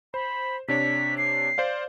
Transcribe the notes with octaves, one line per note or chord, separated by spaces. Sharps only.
C5 B5
C3 D4 C#5 B6
C7
C5 D5 F5